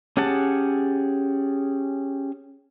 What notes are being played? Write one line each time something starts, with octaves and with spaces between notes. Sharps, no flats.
C#4 G4 G#4 F#5 A5